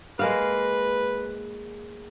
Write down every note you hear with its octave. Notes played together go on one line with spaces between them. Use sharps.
G#3 A#3 B4 F5